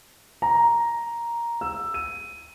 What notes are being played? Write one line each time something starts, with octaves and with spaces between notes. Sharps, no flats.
A#5
E6
D#7